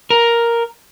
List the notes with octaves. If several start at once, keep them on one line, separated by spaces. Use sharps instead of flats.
A#4